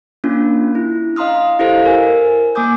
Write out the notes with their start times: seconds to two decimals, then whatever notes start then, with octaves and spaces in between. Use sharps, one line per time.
0.24 A#3 C#4 D4 F4
0.75 E4
1.16 D#5 F5 A#5 C6 D#6 F6
1.59 E4 G4 A4 C5 D#5 F5
1.85 A#4 G#5
2.55 A#3 G#5 D6 D#6 G6